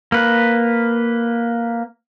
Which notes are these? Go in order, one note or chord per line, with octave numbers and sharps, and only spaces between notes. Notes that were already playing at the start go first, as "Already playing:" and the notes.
A#3 B4